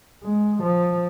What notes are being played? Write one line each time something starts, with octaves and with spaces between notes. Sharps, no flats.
G#3
F3